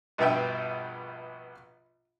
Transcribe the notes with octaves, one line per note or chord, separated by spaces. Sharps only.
A#1 G2 B2 E5 G5